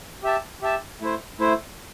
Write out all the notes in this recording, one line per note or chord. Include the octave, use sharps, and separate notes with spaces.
G4 E5 A5
G4 E5 A5
A3 E4 C5
A3 E4 C5